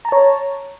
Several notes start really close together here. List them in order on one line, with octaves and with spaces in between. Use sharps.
A#5 A5 C#5